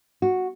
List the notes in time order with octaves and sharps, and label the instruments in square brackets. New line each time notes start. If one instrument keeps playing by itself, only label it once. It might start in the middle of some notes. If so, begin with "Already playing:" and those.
[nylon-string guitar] F#4